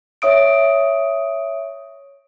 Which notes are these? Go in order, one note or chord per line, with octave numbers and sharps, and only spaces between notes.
C#5 E5 D#6 D7